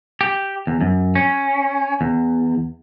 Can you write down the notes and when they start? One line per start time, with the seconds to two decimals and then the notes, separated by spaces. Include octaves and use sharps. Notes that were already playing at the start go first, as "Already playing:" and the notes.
0.21 G4
0.67 E2
0.81 F#2
1.15 C#4
2.01 E2